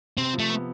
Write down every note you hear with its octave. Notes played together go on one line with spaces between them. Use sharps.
C3 C4
F3
A3
B3